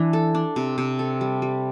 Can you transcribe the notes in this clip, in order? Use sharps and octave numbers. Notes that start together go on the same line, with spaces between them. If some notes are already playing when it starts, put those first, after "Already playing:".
Already playing: E3 D4
A4
D4
C3
C3
A4
G3
G3